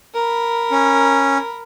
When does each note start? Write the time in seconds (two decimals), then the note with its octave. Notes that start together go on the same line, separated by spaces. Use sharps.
0.15 A#4 B5
0.72 C#4